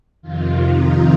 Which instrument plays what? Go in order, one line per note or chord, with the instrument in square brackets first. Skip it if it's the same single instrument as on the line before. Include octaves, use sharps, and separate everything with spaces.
[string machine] F2 C3 D#3 F4
D#4